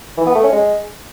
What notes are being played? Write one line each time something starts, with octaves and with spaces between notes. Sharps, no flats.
E3
B3
A3
C#4
G#3